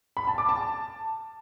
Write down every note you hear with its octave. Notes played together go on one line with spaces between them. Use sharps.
B5
A5
D6
A5